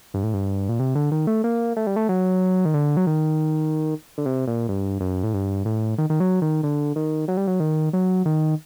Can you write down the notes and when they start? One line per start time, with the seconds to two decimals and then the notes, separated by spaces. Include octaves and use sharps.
0.14 G2
0.24 A2
0.34 G2
0.69 A#2
0.80 C3
0.95 D3
1.12 D#3
1.27 A3
1.44 A#3
1.76 A3
1.87 G3
1.96 A3
2.09 F#3
2.65 D#3
2.74 D3
2.97 F#3
3.07 D#3
4.18 D3
4.26 C3
4.47 A#2
4.69 G2
5.00 F#2
5.24 A2
5.34 G2
5.65 A2
5.98 D#3
6.10 D#3
6.20 F#3
6.42 D#3
6.63 D3
6.96 D#3
7.28 F#3
7.37 G3
7.47 F#3
7.60 D#3
7.93 F#3
8.25 D#3